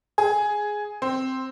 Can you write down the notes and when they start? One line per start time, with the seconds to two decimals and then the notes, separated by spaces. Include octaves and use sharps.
0.18 G#4
1.02 C4